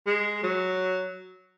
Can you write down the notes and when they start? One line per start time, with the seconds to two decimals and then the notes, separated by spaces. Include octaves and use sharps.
0.06 G#3
0.43 F#3